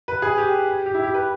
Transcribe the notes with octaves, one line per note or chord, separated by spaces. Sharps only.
B4
G#4
G4
G4
E4
G4
B4